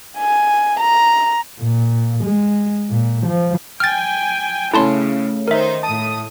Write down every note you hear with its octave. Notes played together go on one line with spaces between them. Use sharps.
G#5
A#5
A#2
G#3
A#2
F3
G5 G#5 F6 A6
A2 C#3 A3 C#4 E4 A5 C6
D#3 D#4 A#4 C5 E5
A2 A5 D#6